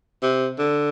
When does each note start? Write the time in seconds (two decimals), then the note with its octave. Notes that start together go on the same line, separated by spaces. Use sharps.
0.22 C3
0.58 D3